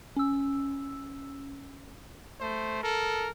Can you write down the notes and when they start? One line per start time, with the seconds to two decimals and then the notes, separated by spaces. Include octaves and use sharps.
0.16 C#4 E6
2.40 A3 C5
2.83 A4 A#4